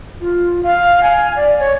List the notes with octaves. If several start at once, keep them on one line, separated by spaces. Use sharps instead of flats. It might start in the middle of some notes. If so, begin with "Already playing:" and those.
F4
F5
G#5
D5
C#5